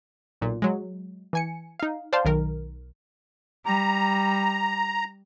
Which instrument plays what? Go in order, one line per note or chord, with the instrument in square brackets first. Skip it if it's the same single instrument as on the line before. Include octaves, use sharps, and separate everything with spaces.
[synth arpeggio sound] B1 A#2
F#3 G#3
E3 G#5 C#7
D#4 F5
C5 D5 F5 G5 A5 C6
B1 D#3 A#4
[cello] G3 [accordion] A#5